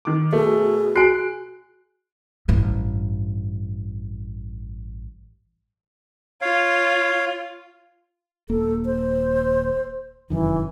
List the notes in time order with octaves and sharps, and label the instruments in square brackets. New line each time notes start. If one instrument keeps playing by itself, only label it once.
[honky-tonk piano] D#3 D6
[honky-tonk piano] B2 [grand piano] A3 [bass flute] G#4
[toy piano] F#4 G#5 [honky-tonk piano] F#6 [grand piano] C7 D7
[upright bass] A1 G2
[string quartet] F4 [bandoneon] C#5 F5
[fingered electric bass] D#1 A#3 [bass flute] A4
[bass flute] C5
[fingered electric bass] F1 F#2 D#3 [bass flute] E3